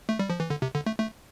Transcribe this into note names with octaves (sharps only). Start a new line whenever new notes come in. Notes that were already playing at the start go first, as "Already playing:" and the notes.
A3
G3
F3
E3
D3
C3
D3
A3
A3